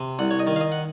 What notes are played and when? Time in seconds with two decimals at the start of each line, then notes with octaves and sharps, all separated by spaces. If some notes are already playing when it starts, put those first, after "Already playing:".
Already playing: C3
0.19 C2 F#5
0.31 C#5
0.39 D#5
0.47 D#3
0.56 F5
0.61 D#5
0.72 F#5